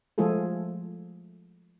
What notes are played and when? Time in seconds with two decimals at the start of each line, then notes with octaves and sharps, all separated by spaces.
0.18 F3 G#3 A3 F4 G#4 A4